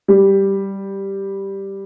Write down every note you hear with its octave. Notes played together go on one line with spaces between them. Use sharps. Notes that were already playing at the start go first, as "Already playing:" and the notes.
G3